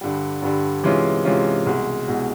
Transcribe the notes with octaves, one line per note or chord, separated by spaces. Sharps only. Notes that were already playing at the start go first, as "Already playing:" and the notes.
G2 D3 G3
G2 D3 G3
C3 E3 G#3 C#4 F4
C3 E3 G#3 C#4 F4
C2 B2 G#3
C2 B2 G#3